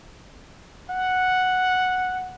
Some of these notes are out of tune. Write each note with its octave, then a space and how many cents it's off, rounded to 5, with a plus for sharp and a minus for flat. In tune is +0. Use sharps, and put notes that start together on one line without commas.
F#5 -5